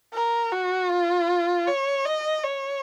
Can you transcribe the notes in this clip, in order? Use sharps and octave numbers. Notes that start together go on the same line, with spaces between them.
A#4
F#4
F4
C#5
D#5
C#5